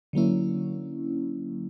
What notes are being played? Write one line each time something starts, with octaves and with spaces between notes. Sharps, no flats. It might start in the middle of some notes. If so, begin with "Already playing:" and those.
D3 F#3 A#3 C#4 E4